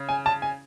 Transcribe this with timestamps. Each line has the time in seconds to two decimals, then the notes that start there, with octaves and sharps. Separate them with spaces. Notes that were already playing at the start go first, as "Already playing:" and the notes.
Already playing: C#3
0.09 G#5
0.26 A5
0.42 G#5